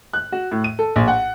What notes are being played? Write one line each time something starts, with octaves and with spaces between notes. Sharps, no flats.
F#6
F#4
A2
D#7
A4
A#1
F#5